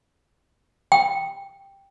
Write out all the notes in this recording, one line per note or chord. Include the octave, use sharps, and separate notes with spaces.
G5